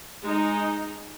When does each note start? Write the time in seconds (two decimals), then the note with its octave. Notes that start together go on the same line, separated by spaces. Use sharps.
0.23 G#3 D#4